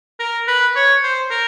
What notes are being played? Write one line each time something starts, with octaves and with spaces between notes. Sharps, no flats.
A#4
B4
C#5
C5
A#4